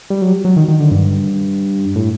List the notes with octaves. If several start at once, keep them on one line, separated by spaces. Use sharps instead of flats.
G3
F#3
F#3
D#3
D#3
D3
G2
A2